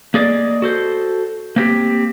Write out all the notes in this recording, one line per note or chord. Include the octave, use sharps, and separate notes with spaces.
A#3 G#4 D5 D#5
F#4 A4 C5
A#3 C4 G4